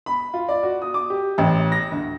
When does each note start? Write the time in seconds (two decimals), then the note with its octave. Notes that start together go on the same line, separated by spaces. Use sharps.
0.06 B5
0.34 F4
0.49 D5
0.63 F#4
0.82 D#6
0.94 D6
1.10 G4
1.38 A1
1.72 A#6
1.91 D2